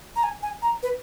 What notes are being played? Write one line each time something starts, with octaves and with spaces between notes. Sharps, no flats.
A#5
G#5
G#5
A#5
B4